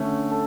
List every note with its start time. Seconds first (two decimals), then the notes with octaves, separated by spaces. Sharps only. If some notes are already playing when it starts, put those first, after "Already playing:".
Already playing: D3 A3 C#4
0.31 A4